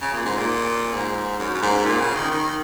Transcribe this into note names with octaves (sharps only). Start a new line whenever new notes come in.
C#3
A#2
G#2
A#2
G#2
F#2
F#2
G#2
A#2
C#3
D#3
D#3